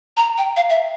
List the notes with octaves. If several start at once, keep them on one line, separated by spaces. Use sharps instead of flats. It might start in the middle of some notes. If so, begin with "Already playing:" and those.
A#5
G5
F5
E5